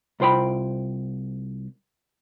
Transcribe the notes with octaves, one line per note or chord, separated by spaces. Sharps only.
C2 F4 C5 G5 B5